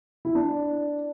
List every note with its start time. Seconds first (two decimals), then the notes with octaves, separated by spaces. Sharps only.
0.25 E4
0.35 D4